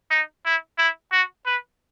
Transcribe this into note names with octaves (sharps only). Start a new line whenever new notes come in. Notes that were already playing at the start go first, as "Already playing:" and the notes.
D#4
E4
E4
F#4
B4